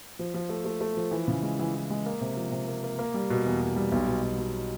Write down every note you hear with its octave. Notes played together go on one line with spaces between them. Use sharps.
F3
F3
A3
A3
A3
F3
E3
C#3
G#3
E3
E3
G#3
A#3
C3
F3
C3
A#3
A#3
A#3
G3
B2
E2
B2
G3
B1
B2
B1
F#3